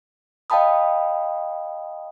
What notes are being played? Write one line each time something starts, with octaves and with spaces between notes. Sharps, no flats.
D#5 F5 G5 A5 B5 D#6